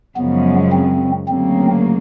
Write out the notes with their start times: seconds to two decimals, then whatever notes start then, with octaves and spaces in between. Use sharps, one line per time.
0.17 F#2 C#3 F3 G#3 B3
0.73 C4
1.28 D2 C#3 F#3 A#3 C4